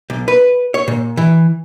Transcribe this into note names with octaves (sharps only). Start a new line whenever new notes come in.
B1
B4
C#5
A#2
E3